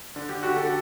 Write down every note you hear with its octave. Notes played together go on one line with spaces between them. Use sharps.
D3
G4
D3 F#4
A4